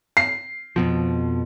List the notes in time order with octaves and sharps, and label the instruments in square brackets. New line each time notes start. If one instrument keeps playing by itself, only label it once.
[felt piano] C7
[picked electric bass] F2 B2 F3